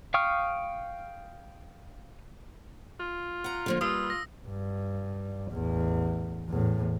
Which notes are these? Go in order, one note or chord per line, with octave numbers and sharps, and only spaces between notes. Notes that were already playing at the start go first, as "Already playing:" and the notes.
F5 G5 C#6 D#6 F6
F4
F#5 A#5
D3 F3 A#3
G3 A#3 F4 B4 D#6 E6
A#6
G2
A1 E2
E2 A2